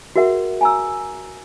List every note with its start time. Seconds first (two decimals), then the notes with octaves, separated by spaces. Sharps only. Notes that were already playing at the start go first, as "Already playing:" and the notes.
0.16 F#4 G#4 A#4 E5 F#5
0.61 G#5 A#5 E6